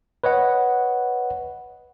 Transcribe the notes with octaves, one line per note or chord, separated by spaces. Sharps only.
B4 C#5 D#5 F#5